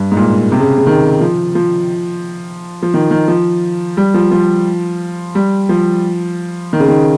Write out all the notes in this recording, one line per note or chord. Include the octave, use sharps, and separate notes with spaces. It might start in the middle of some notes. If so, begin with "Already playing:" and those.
Already playing: G2
G#2
A#2
C3
C#3
C#3
D#3
F3
F3
F3
D#3
D#3
F3
G3
F3
F3
G3
F3
D#3
C#3
D#3